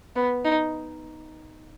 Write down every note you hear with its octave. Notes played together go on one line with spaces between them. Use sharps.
B3
D#4